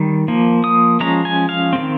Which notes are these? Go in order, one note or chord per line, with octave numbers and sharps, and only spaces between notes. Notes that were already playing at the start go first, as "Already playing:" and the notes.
Already playing: D#3 G3
F3 A#3
D#6
F3 G#3 C#4 A#5
G#5
F5
D#3 G#3 C4